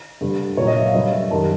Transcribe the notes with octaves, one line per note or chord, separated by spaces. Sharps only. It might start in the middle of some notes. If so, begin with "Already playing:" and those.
G2 D3 G3
A#2 F#3 C#5
D#5
E5
F5
G2 D3 F#3 D#5
E5
F#2 D#3 G3 A5